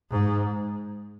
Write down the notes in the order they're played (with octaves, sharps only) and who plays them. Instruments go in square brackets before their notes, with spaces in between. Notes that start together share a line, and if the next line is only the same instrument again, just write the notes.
[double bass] G#2